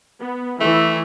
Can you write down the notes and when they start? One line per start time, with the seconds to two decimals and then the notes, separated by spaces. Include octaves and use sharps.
0.19 B3
0.60 E3 A3 E4